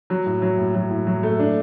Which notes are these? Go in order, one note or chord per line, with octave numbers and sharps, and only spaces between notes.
F#3
A2
F#3
A2
F#3
A2
F#3
A3
D4